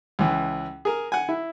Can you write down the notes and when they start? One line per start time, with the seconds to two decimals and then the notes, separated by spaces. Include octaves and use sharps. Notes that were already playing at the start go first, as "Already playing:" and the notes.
0.19 C#2 E3
0.85 G#4 A#4
1.12 F#5 G#5
1.29 E4